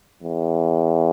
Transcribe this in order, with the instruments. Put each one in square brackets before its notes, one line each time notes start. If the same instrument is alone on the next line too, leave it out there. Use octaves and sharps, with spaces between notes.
[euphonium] E2